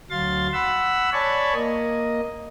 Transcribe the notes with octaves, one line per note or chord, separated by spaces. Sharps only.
D2 F#3 F5 C6 A6
F#5 B5 E6
C#5 D5 G#5 A5 B5 C#6
A#3 D#5